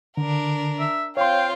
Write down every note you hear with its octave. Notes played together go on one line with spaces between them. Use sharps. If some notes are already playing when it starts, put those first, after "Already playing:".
D3 D4 A#4
E5
C4 F4 C#5 F5 G5 C6